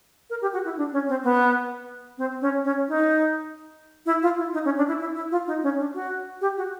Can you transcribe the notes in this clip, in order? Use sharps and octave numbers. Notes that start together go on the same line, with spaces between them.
A#4
G4
F#4
E4
D4
C#4
C4
B3
C4
C#4
C#4
D#4
E4
F4
E4
D#4
C#4
D4
E4
E4
E4
F4
D#4
C#4
D4
F#4
G4
F#4